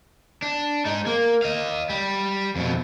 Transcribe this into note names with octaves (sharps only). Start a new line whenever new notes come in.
D4
G#3 D#4
A#3
D#5 F5
G3
F2 B2